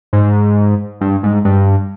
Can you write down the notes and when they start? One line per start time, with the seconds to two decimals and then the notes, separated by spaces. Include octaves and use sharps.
0.13 G#2
1.01 G2
1.23 G#2
1.45 G2